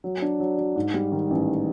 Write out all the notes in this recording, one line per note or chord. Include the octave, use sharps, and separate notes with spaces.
F#3
D4
F#3
F#3
G#2
G3
D#3
A1